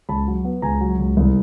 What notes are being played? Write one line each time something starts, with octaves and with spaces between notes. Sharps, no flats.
C#2 A5 B5
F#3
B3
C#2 G#5 A#5
F#3
C#2
C2